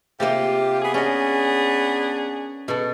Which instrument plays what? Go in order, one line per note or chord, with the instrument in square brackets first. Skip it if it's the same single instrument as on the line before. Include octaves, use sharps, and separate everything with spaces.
[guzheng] C3 A#3 C5 [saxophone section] F4 G4
[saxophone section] B3 G#4
[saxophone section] B3 D4 G#4 [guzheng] C#4 D#5
[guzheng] B2 A4